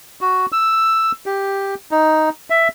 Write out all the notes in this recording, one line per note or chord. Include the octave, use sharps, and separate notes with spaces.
F#4
E6
G4
D#4
E5